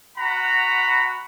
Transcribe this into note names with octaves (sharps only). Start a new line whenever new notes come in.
F#4 F#5 A#5 B5